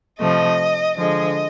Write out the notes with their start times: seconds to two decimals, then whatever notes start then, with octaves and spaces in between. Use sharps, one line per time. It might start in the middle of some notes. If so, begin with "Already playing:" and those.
0.19 C3 F3 A3 D#5
0.98 D3 F3 G#3 D#5